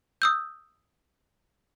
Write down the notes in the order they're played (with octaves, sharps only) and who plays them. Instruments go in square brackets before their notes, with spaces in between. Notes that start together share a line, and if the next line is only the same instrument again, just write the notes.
[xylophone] D#6 E6 G6